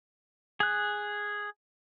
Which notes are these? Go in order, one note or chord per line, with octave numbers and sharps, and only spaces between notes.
G#4 F#6